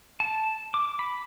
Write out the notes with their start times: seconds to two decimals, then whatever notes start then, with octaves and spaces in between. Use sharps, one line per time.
0.20 A5
0.74 D6
0.99 B5